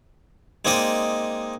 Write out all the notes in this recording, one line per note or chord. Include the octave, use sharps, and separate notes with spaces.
G#3 A#3 C4 D#4 D5 D#5